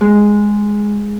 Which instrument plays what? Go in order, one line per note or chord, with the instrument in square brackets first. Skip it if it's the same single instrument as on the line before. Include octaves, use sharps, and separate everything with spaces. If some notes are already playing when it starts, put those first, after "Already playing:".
[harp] G#3